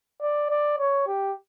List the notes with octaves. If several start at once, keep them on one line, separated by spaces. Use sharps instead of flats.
D5
D5
C#5
G4